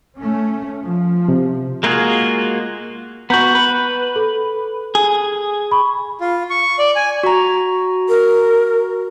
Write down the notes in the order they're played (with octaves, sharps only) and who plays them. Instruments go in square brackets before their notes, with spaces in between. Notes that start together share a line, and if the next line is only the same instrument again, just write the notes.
[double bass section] A3 C#4
F3
[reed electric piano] C3
[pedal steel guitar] G#3 A#3 F4 F#4 G#4
[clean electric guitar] B3 F#4 [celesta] A#5 G6
[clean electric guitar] B4
[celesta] A4
[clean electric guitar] G#4
[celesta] B5 C#6
[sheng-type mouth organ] F4
C#6
D5
G#5
[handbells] F#4 A#5
[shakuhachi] A#4